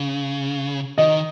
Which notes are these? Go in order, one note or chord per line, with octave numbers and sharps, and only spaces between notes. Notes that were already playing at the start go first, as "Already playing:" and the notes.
Already playing: C#3
D#3 D#5